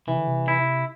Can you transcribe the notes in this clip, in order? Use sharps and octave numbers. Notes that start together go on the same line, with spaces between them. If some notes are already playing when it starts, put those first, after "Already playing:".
C3 E3
D3
C3
E4